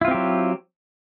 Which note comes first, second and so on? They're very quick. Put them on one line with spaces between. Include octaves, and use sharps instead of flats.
E4 F4 C4 G4 F#3